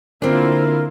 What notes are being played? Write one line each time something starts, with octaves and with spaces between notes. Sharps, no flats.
D3 A#3 C4 D4 E4 F4 A#4